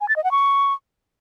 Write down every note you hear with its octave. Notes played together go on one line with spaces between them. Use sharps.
G#5
A6
D#5
F#5
C#6